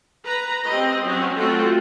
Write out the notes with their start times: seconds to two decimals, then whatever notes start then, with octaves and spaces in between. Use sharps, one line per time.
0.24 B4 A#5
0.66 C4 G4 D#5
1.05 F#3 C4 C#4
1.36 A3 C4 F4 F#4 A4